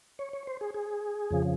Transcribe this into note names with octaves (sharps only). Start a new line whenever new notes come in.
C#5
C#5
C5
G#4
G#4
F2 C#3 F3